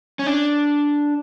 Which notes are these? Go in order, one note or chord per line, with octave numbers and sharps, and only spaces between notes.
C#4
D4